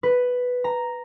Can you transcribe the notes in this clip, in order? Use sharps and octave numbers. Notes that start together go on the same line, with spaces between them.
B4
A#5